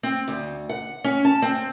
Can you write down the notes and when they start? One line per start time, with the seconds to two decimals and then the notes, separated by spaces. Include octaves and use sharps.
0.03 C4
0.28 D2
0.69 F#5
1.04 C#4
1.25 A5
1.42 C4